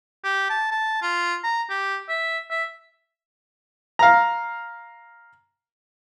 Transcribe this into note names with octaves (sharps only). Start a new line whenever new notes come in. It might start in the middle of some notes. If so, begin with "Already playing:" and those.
G4
A5
A5
F4
A#5
G4
E5
E5
F5 A#5